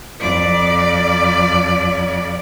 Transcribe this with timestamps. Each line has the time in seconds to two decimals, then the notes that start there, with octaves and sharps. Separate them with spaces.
0.20 F2 D5